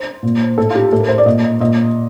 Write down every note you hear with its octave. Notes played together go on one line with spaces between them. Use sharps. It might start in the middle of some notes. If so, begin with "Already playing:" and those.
Already playing: C5
A#2
A2 A4
F4
G4
A2 A4
A#4
C5
D5
A#2 D#5
D#5
A#2 D#5